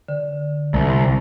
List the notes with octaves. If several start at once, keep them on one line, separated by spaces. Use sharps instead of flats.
D3
C2